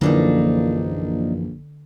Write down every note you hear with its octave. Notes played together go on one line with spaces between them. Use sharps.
A#1 F#2 D3 E3 F3 A#3 D4 D#4